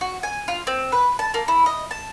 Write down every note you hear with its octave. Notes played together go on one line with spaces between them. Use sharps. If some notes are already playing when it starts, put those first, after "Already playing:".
F#4
G#5
F4
C4
B4
A5
A#3
E4
D#5
A5